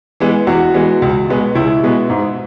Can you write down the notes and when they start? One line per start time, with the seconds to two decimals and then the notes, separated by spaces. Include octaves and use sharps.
0.20 E3 G#3 B3
0.47 E2 F#4
0.74 E3 G#3 B3
1.02 C#2
1.29 B2 G#3 B3
1.55 C#2 E4
1.83 B2 G#3 B3
2.10 G#2